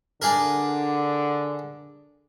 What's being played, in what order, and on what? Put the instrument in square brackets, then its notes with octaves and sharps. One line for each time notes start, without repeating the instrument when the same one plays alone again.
[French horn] D3 [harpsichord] D4 G#4 A#4